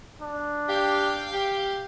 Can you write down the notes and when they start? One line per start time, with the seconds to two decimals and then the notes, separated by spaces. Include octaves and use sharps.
0.22 D4
0.69 G4 F5 G5
1.33 G4